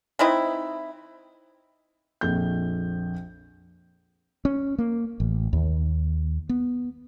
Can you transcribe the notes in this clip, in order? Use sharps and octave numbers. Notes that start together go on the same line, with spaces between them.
E3 C4 D#4 E4
A#1 F2 G6
C#4
A#3
A1
D#2
B3